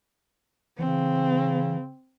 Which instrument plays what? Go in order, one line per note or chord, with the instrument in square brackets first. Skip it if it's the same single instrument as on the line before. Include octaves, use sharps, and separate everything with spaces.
[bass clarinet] C#3 [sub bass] E3 [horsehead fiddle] C4